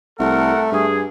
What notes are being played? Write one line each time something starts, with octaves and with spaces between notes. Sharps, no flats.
C2 A3 A4 A#4 F#5
G2 G#4